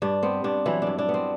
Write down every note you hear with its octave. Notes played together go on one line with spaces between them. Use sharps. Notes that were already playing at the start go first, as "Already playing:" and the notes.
G2 D4
B3 C4
G2 D4
E3 F#3 E4
D4
G2
D4
B3
C4